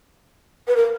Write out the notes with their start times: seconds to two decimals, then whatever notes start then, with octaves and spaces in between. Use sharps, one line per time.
0.68 B4
0.76 A#4